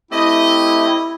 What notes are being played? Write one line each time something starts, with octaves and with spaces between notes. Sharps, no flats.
A3 C4 E4 G4 D#5